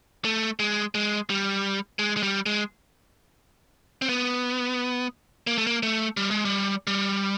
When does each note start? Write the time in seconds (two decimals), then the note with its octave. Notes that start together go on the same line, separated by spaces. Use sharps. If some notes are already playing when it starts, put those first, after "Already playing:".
0.25 A3
0.59 G#3
0.95 G#3
1.30 G3
1.99 G#3
2.17 G#3
2.23 G3
2.46 G#3
4.02 C4
4.09 B3
5.47 A#3
5.58 A3
5.67 A#3
5.83 A3
6.17 G3
6.31 G#3
6.45 G3
6.87 G3